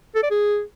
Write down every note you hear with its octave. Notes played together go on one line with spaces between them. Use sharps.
A4
D5
G#4